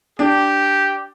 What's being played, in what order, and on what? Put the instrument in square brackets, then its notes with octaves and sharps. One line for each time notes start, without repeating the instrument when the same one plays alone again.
[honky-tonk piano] D4 [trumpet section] G4